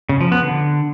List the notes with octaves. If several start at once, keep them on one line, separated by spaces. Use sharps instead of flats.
C#3
F3
B3
D3